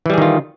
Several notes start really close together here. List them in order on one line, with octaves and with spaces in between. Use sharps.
E3 G3 G#4 D#3 F4